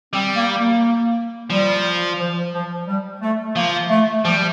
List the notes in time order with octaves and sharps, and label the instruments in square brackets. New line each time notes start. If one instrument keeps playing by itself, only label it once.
[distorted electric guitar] G3 [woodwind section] C4
[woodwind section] A#3
A#3
[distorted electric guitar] F3 [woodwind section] G3
[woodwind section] F3
F3
G3
A3
[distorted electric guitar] F3 [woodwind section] A#3
[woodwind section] A3
[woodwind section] F3 [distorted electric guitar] G3